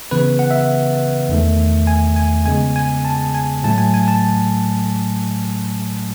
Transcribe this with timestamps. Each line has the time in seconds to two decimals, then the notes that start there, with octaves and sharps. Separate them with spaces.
0.11 C#3 E3 B3 B4
0.39 F#5
0.51 E5
1.29 E2 D#3 A3
1.87 G#5
2.16 G#5
2.46 C#3 G#3 B3 G#5
2.76 G#5
3.05 A5
3.35 G#5
3.64 A2 F#3 A3 A5
3.78 G#5
3.94 G#5
4.08 A5